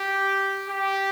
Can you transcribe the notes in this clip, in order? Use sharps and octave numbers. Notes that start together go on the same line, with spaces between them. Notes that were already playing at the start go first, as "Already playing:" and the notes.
Already playing: G4
G4